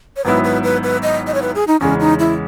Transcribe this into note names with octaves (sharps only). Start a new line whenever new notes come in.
C#5
G#1 G#2 F#3 B3 E4 B4
B4
B4
B4
D#5
D#5
C#5
B4
G#4
D#4
E2 C#3 G#3 C#4
D#4
E4